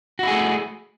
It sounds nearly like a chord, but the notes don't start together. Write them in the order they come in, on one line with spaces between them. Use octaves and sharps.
F#4 E4 G#4 A3